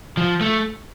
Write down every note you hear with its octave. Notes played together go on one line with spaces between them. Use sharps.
F3
A3